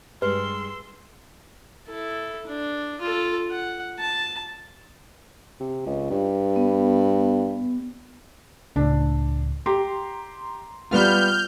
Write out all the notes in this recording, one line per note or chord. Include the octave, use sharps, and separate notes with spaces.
G2 G3 G#3 B4 C6 E6
E4 A4
D4
F4 A4
F#5
A5
C3
C#2
G2
B3
C#2 A2 D4
G4 A#5 C6
G3 B3 F4 F6 G6